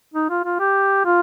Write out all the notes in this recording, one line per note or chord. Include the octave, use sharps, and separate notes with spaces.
D#4
F4
F4
G4
F4